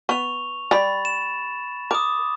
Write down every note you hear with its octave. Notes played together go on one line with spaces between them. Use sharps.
B3 C#6 F7
G3 B5 A6
E7
A#4 D6 D#6